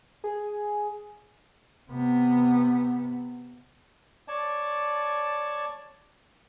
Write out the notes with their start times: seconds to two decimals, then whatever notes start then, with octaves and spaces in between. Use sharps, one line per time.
0.24 G#4
1.90 C3 B3
4.28 C#5 D5 A5